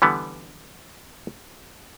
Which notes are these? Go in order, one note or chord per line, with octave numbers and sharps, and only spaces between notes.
D3 E3 G3 B3